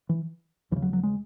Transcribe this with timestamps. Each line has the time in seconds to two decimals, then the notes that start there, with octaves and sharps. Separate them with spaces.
0.09 E3
0.71 D#2 E3
0.76 C#3
0.82 F#3
0.93 F#3
1.03 G#3